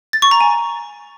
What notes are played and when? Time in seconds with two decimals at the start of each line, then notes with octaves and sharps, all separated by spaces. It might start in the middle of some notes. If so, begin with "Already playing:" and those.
0.13 A6
0.22 C#6
0.31 A#5
0.40 G#5